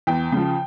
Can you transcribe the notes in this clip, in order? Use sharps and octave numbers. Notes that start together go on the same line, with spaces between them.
E2 G5
C#3 F3